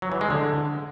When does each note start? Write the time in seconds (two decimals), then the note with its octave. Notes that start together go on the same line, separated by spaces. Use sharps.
0.02 F#3
0.12 E3
0.21 G#3
0.30 D3